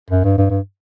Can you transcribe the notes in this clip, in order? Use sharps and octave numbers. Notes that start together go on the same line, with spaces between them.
F#2
G2
G2
G2